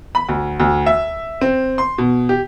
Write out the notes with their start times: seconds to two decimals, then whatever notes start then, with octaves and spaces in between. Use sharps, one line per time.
0.15 B5
0.29 D2
0.60 D2
0.86 E5
1.41 C4
1.78 C6
1.98 B2
2.29 G4